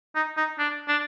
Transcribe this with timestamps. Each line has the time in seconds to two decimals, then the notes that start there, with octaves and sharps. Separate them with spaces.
0.15 D#4
0.37 D#4
0.59 D4
0.88 D4